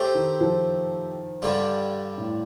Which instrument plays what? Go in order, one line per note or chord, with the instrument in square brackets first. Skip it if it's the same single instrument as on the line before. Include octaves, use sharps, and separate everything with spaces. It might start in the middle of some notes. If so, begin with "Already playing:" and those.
Already playing: [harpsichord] A3 C4 G4 C5
[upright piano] D#3
F3
[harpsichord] G2 D3 G3 D4 F4
[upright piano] A2